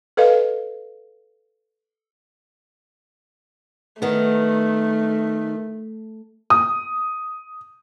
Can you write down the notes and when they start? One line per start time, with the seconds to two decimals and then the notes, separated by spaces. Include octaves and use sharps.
0.17 A4 B4 D#5 F5
4.02 D#3 A3 B3
6.50 D#6